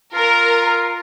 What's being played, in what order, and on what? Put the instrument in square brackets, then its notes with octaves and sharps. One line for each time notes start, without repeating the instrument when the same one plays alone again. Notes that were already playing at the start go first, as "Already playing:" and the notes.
[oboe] F4 [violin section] A#4